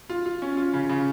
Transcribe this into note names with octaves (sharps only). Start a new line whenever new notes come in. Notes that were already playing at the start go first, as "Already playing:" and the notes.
F4
F4
C#4
F4
C#3
C#3